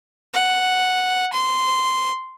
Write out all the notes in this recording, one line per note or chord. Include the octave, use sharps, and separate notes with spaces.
F#5
C6